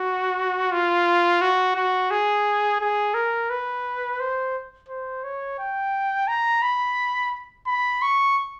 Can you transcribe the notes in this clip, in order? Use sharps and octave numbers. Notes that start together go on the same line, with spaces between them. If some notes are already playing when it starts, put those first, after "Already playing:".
Already playing: F#4
F4
F#4
F#4
G#4
G#4
A#4
B4
C5
C5
C#5
G5
A#5
B5
B5
C#6